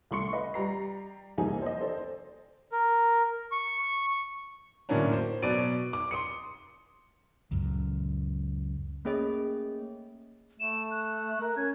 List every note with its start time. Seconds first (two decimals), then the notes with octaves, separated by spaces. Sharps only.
0.11 C2 A3 C6 C#6 C#7
0.32 B4 D#5 F5 B5
0.54 G3 A#5 C7
1.38 C2 F2 A#3 D#4 G#4 G#5
1.62 C5 D#5
1.80 A4 C5 D5
2.72 A#4
3.52 C#6
4.89 A2 D3 F#3 A#3 C#4 D4
5.12 C5
5.42 B2 F#3 D5 D7 D#7
5.93 D6
6.11 C6 D#6 C#7
7.51 C#2 F#2
9.05 A3 A#3 C#4 G#4 C#5 D#5
10.60 A3 E7
10.91 F#6
11.41 A#4
11.57 C#4 G#6